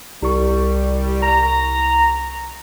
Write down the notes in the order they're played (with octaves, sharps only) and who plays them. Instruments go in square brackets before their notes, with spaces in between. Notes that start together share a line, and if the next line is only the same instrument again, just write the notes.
[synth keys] C2 C#6 [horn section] G3
[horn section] A#5